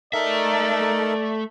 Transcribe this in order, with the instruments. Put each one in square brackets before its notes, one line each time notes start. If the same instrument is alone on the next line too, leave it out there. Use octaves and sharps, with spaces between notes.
[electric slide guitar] A3 E5 [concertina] D#4 A4 A#4 [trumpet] D5